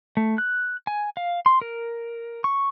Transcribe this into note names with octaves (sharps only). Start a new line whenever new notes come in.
A3
F#6
G#5
F5
C6
A#4
C#6